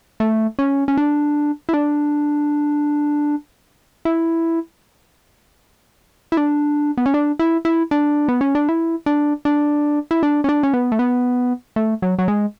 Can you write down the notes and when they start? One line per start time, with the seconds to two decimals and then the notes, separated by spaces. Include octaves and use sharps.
0.20 A3
0.59 C#4
0.88 C#4
0.98 D4
1.69 E4
1.73 D4
4.05 E4
6.32 E4
6.37 D4
6.98 B3
7.06 C#4
7.14 D4
7.39 E4
7.65 E4
7.91 D4
8.28 B3
8.41 C#4
8.55 D4
8.69 E4
9.06 D4
9.45 D4
10.11 E4
10.23 D4
10.44 C#4
10.49 D4
10.63 C#4
10.74 B3
10.92 A3
10.99 B3
11.76 A3
12.02 F#3
12.19 F#3
12.28 G#3